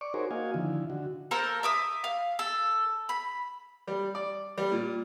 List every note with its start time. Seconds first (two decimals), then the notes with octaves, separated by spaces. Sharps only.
0.01 D5 C#6 D6
0.14 D#4 F#4 G#4 A#4 C5 C#5
0.31 A#3 F#4 D#5 F5 G#5
0.54 D3 D#3 F3 E4
0.90 D3 F#4
1.31 A#3 A4 A#4 C5
1.63 E5 D6 D#6
2.04 F5
2.39 A4
3.09 B5
3.87 G3
4.15 D5
4.58 G3
4.72 A#2